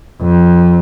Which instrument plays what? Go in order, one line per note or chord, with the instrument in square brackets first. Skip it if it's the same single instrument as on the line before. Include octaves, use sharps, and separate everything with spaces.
[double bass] F2